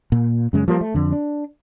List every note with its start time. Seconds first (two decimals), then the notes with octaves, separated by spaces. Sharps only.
0.12 A#2
0.53 F#2 C#3 G#3
0.68 F3 G3 A#3
0.81 A3
0.94 F2 D3
1.12 D4